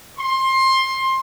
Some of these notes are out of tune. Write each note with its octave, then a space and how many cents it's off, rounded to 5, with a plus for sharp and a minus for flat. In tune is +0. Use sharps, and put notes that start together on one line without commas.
C6 +20